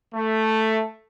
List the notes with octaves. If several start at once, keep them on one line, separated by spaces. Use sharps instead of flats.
A3